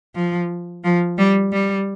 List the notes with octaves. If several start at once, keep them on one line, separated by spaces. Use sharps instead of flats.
F3
F3
G3
G3